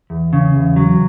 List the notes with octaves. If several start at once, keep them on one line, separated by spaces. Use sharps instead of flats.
E2
C#3
E2
F#3